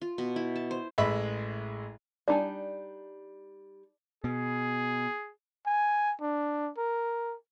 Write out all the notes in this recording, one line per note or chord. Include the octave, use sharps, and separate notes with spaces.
F4
B2
E4
A5
C5
A1 G#3 E5 B5
G3 D4 D#4 D5 G#5 A5
B2 G#4
G#5
D4
A#4